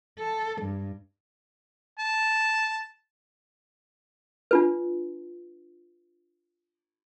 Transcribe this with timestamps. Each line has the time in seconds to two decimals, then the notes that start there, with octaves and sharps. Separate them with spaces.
0.19 A4
0.61 G2
1.99 A5
4.51 D4 F4 B4